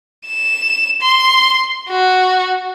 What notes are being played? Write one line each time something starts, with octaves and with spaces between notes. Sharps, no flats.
E7
C6
F#4